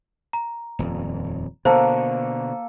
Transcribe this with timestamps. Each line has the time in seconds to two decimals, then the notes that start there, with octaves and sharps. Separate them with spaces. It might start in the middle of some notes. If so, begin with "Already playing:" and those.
0.33 A#5
0.79 D#1 F2
1.65 B2 D3 A#3 A4 C5